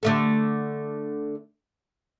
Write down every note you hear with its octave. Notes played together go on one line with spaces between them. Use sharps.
D3 A3 A4